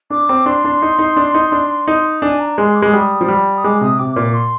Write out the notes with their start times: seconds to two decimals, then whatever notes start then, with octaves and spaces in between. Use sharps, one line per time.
0.10 D4 D6
0.29 C4
0.46 D4 C6
0.65 D4
0.82 D#4
0.99 D#4
1.17 D4
1.34 D#4
1.52 D4
1.88 D#4
2.22 D4 G#5
2.40 A#5
2.58 G#3 C6
2.75 D6
2.82 G#3
2.93 G3 D#6
3.21 F3
3.28 G3
3.57 D#6
3.64 G#3 D6
3.81 C3 D#6
3.99 C3 D6
4.16 A#2 D6
4.34 C6